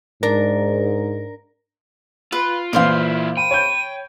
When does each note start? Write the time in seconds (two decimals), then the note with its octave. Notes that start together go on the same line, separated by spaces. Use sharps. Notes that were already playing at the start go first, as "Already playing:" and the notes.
0.23 G#2 D4 A#4
2.32 F4 B4
2.73 A#2 E3 E4 F4 A#4 C5 F5
3.37 G5 B5 D#7
3.51 C#5 B5 G6